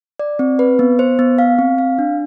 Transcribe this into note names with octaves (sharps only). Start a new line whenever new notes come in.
D5
C4
B4
B3
C5
B3
F5
C4
F5
D4